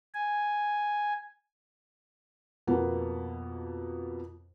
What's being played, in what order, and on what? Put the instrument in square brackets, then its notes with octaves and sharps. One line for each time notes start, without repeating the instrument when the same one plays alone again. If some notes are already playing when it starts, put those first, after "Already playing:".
[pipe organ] G#5
[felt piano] F2 B2 A#3 B3